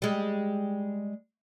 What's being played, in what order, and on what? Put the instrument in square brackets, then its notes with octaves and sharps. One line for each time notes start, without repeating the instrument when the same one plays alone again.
[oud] G3 G#3